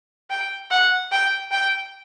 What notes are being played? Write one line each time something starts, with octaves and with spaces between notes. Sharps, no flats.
G5
F#5
G5
G5